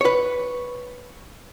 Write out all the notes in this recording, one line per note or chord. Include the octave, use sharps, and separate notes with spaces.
B4 C#5